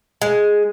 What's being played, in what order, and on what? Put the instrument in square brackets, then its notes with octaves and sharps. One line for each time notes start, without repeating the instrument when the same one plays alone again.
[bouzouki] G#3